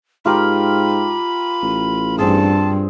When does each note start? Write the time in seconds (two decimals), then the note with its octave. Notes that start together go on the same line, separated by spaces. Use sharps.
0.25 G#2 F4 G4 A#4 B5
1.62 A1
2.18 G2 C4 G#4 A5